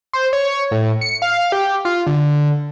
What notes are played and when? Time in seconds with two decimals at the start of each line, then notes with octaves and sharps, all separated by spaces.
0.13 C5
0.33 C#5
0.71 A2
1.01 C#7
1.22 F5
1.52 G4
1.85 F4
2.07 D3